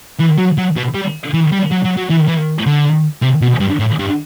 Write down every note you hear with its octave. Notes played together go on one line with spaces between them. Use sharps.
E3
F#3
F#3
B2
G3
E3
G3
F#3
F#3
F#3
E3
E3
D3
C3
B2
G2
A2
G2